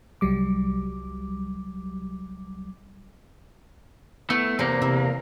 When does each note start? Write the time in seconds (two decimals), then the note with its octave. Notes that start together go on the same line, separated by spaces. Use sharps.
0.21 C2 F#3 G3 D6
4.30 A3 B3 E4
4.59 E2 C3 A#3 D5 C6
4.82 C3 E4